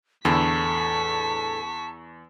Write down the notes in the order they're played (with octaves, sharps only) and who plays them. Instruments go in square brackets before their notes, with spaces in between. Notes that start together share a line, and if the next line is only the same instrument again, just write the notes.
[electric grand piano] E2 [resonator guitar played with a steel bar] A2 D3 [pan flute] A5 [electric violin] C#6 B6